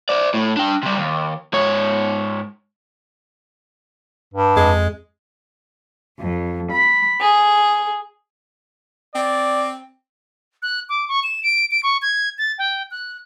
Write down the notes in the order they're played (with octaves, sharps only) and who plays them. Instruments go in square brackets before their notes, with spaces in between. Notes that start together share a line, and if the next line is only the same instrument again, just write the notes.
[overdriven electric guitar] C5 D5
A2
D4 G5
C3 G3
D#2
G#2 C#5
[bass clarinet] G2
[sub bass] F2 [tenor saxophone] G#3
[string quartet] F2
B5
G#4
[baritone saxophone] C4 [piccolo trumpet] D5
[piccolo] F#6
D6
C#6
E7
D7
D7
C#6
G#6
A6
G5
F#6